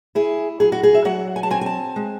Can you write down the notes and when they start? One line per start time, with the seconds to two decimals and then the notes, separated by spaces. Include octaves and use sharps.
0.15 E4 G#4
0.60 F#3 G#4
0.72 F#4
0.83 G#4
0.94 E5
1.05 F#3 F#5
1.36 G#5
1.43 A5
1.50 C4 G#5
1.61 G#5
1.66 A5
1.96 G#3